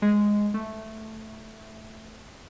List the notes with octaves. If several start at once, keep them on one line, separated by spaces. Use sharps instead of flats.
G#3
A3